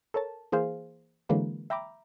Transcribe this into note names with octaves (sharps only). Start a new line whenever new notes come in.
A4 A#4 C#5 A5
E3 A#3 G#4 C5 F5
D3 E3 F#3 G#3 A#3 B4
E5 G5 A#5 B5 D6